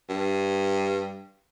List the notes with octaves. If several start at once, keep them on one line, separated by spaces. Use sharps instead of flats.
G2